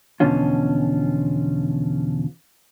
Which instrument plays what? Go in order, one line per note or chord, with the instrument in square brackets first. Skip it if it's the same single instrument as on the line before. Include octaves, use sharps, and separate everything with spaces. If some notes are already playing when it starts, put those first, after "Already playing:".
[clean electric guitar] E2 B2 D3 F3 C#4 F4